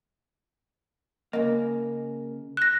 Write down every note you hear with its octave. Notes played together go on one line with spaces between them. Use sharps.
C#3 A#3 D#5
F#6 A#6